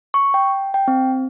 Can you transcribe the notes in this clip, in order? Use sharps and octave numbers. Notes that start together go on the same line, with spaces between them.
C#6
G5
G5
C4